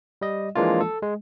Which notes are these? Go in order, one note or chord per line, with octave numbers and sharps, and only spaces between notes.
G3 D#5
E3 F3 G#3 A#3 D4 F4
A4
G#3